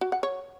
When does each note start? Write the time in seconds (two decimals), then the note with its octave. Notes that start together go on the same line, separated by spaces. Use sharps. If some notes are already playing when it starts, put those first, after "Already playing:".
0.01 F#4
0.12 F#5
0.23 C#5